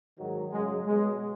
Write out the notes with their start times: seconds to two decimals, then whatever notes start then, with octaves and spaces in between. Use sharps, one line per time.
0.16 G#2 D#3 F#3
0.51 F#2 C#3 F#3 G#3
0.85 B2 F#3 G#3